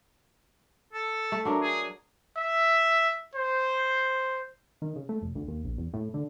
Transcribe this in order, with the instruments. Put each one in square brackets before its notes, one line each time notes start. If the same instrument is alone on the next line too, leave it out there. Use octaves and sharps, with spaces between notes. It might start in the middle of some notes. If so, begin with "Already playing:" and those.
[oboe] A4
[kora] A3
F#3 D4 A#4
[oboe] G#4
[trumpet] E5
C5
[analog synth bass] D#3
C#3
A3
F1
D2
D#2
A#1
E2
A2
D3